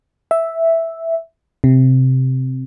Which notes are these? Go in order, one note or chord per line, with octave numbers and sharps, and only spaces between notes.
E5
C3